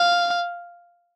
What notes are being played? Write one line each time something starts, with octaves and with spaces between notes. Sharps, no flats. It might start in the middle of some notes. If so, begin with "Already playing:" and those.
Already playing: F5